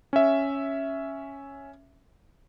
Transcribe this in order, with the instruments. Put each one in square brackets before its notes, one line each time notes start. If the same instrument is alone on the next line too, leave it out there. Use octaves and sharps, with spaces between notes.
[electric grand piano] C#4 E5